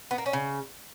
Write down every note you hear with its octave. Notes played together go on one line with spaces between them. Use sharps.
B3
A#3
C#4
C#3